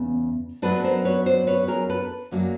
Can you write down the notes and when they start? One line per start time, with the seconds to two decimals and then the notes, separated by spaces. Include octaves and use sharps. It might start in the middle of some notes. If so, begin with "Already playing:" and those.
Already playing: E2 C#3 B3
0.62 F#2 D#3 F#3 B3 D4 A4 B4
0.84 A#4 C5
1.05 B4 C#5
1.26 C5 D5
1.47 B4 C#5
1.68 G#4 A#4
1.89 A4 B4
2.31 F#2 D3 F#3 A#3 D4